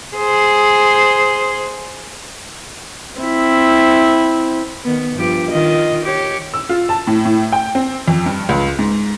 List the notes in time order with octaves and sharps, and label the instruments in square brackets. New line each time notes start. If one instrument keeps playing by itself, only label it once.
[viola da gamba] G#4 C5
[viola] C4 E4
[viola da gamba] D#3 B3
G2 F3 G4
D#3 F4 D#5
G4 C#5
[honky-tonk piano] E6
F4
A5
A2
A2
G5
C4
F2
G2
C#2
G#2